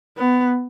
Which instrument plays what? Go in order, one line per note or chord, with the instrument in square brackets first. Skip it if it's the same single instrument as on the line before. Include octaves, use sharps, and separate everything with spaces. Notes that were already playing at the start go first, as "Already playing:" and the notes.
[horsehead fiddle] B3